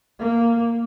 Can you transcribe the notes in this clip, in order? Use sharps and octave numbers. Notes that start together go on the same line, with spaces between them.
A#3